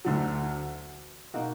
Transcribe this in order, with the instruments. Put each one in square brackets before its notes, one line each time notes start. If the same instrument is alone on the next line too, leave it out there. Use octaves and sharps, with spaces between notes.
[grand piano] D2 D3 F#3
B2 A#3 D#4 F#4